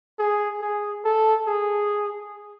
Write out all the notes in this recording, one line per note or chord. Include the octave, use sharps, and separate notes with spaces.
G#4
G#4
A4
G#4